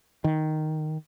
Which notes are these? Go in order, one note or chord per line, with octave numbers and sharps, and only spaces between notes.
D#3